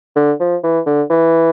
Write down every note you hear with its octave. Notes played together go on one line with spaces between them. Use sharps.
D3
F3
E3
D3
E3